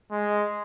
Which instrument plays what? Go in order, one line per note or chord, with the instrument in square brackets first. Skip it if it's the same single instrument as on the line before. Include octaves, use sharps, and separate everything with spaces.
[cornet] G#3